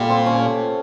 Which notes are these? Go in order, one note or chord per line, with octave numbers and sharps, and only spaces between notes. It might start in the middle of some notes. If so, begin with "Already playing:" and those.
Already playing: A#2 G3 A3 G4 A4
C4 C5
C#4 C#5